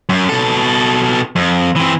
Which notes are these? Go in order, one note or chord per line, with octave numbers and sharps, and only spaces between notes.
F#2
B2 A4
F2
E3 C4